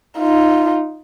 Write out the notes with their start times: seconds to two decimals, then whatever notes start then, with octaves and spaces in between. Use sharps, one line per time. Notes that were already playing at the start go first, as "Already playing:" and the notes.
0.19 D#4 F4